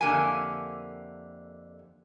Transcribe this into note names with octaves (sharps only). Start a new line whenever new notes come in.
F2 D3 A#3 E4 G4 G#5